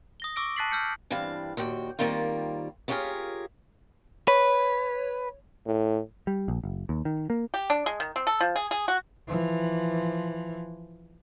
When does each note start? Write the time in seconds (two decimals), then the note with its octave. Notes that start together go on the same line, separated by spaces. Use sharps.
0.20 D#6 A#6 G7
0.36 C#6 D6 E6 A#6 D7
0.56 A5 F#6 A6 B6 C7 F#7
0.71 E6 F6 G6 C#7
1.11 G2 E3 C4 D4 F5
1.57 D#2 A#2 F#4 G5
1.99 D#3 G3 A#3 C4 F4
2.88 B3 C#4 F4 G4 G#4 A#4
4.28 B4 C#5
5.66 A2
6.27 G3
6.48 A#1
6.64 F#1
6.89 D#2
7.05 D#3
7.30 A#3
7.54 G4
7.70 D4
7.86 G#3
8.00 D#3
8.16 C4
8.27 A4
8.41 F3
8.56 G#4
8.71 G#4
8.88 F#4
9.27 E3 F3